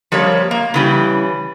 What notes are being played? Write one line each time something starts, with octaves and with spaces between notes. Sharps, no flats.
F3 G3 A#3 C#5
A#3
C#3 E3 G3